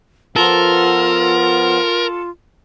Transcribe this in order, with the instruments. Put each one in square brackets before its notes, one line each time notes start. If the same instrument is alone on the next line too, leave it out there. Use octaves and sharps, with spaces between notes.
[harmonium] F3 B3 [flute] F4 [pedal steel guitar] A4 [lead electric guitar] A#4